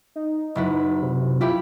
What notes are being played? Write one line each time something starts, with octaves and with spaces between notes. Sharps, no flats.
D#4
F#1 E4 B4
C3
E4 F4 G4 B5